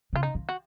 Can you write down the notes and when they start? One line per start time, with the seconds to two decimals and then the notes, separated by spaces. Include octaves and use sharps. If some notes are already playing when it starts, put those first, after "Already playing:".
0.13 C#3 F4
0.23 D#4
0.35 D#3
0.49 F#4